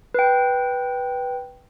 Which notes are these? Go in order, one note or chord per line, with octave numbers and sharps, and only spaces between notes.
B4 G5